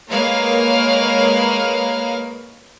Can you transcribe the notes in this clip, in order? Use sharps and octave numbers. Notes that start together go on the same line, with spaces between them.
G#3 A#3 A#4 B4 C#5 F5